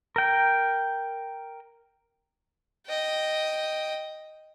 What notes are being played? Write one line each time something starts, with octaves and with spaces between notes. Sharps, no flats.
A#4 G5
D#5 G5